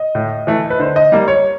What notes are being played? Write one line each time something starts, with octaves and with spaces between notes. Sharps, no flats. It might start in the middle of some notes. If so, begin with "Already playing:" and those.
Already playing: D#5
A2
E3 A3
B4
D3 C5
D#5
G3 A#3
C#5